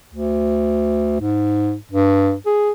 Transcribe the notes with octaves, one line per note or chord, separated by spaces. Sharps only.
D2
G#2
G2
G#4